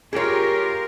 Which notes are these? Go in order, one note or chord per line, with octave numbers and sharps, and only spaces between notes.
F4 G4 G#4 A#4 C#5